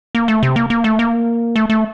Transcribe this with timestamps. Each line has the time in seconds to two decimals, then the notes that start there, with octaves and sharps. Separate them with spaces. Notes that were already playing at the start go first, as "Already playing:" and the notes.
0.15 A#3
0.28 A3
0.43 C3
0.56 A#3
0.70 A#3
0.84 A3
0.99 A#3
1.56 A3
1.70 A3